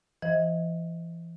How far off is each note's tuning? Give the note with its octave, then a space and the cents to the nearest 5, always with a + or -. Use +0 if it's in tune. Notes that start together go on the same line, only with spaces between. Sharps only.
E3 +35 C5 +0 D#5 +25